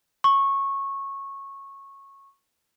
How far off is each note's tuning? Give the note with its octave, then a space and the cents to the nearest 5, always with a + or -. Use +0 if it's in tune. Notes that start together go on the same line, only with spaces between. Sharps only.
C#6 -15